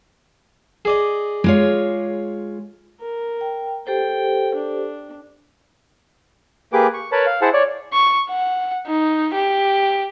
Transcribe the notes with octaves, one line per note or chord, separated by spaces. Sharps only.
G#4 D5 D#5
G#3 F4 C#5
A#4
G5
G4 A4 C5 G5
D4
A#3 G4 G#4 B4 D6
C#6
A#4 B4 C#5 A5 B5
F5
E4 G#4 C5 E5 F#5 A5
C#5 D5
C#6
F#5
D#4
G4